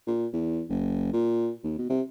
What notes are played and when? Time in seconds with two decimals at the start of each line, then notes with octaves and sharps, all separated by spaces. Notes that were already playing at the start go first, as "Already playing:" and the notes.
0.07 A#2
0.33 E2
0.70 F#1
1.13 A#2
1.64 D#2
1.78 B2
1.90 C3